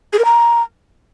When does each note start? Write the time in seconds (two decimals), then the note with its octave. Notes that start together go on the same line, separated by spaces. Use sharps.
0.13 G#4
0.19 A#4
0.25 A#5